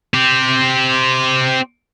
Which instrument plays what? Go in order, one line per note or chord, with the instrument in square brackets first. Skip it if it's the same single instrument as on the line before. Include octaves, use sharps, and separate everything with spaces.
[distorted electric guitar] C4 G4